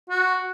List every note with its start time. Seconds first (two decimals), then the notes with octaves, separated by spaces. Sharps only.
0.10 F#4